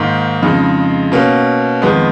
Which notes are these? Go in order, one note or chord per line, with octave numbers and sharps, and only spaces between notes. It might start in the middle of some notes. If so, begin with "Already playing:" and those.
Already playing: G#2 D#3 A#3
F2 C#3 G#3 D#4
B2 A#3 C#4
F2 D#3 G#3 B3